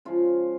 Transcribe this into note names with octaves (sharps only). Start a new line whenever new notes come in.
C#3 F3 G#3 F4